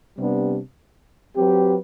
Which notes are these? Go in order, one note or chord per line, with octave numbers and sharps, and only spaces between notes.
C3 G3 B3 D4
F#3 C4 G4 B4